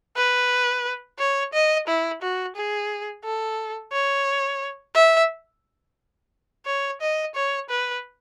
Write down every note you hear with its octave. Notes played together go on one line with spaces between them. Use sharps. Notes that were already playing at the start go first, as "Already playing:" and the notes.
B4
C#5
D#5
E4
F#4
G#4
A4
C#5
E5
C#5
D#5
C#5
B4